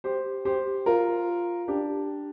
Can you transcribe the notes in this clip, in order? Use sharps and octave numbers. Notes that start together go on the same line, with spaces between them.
G4 C5
G4 C5
F4 A#4
D4 G4